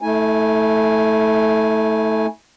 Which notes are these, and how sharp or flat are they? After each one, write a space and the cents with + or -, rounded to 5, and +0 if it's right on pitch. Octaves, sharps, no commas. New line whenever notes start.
A3 +0 E4 -40 G#5 +0